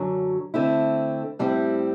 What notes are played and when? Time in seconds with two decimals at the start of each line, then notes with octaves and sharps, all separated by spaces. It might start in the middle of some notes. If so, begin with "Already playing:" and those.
Already playing: F#2 D3 F#3
0.54 D3 A3 C4 E4
1.39 A2 G3 C4 E4